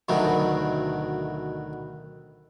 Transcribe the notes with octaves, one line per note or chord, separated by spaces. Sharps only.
D2 B2 D#3 F#3 A3